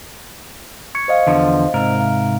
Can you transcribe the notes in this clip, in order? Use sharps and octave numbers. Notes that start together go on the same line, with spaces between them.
C#6 G#6 C#7
C5 D#5 F5
E2 D3 F3
G#2 C3 A#4
F5